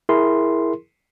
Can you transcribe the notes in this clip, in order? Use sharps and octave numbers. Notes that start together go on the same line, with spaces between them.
E4 G#4 A#4 C6